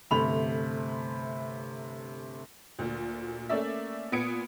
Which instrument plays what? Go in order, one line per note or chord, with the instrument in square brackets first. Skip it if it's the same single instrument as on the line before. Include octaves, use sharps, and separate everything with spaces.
[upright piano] G1 C3 A3 B5 F7
[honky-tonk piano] D2 A#2
A3 A#3 C#4 D5 E5
A#2 B3 D#6 G#6 C#7 D7